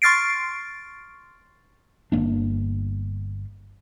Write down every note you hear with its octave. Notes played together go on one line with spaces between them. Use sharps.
C6 C#6 F6 A6 C7 D7
G1 A2 A#3 D4